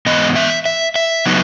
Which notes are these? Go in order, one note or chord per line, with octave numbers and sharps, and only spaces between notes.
G#2 E3 B3 D#5
E5
E5
E5
C#3 F#3 B3 D#4